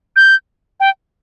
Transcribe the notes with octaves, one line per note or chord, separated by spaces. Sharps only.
G6
G5